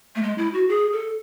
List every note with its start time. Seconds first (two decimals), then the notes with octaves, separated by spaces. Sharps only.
0.16 A3
0.23 G#3
0.38 E4
0.54 F#4
0.69 G#4
0.92 A4